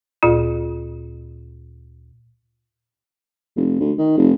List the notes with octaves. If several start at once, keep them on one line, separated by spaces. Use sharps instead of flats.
D2 A#2 F4
F1
D2
D#3
F1